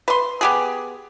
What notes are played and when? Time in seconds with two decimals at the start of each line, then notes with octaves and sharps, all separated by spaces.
0.08 B4 C6
0.41 B3 G4 G#4